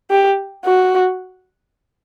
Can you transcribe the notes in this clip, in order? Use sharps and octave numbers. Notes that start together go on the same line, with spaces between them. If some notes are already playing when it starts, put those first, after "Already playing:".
G4
F#4